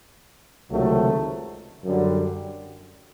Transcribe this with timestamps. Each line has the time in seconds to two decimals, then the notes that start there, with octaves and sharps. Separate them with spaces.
0.70 C#2 C3 D#3 F#3 A3
1.84 F#2 D3 G3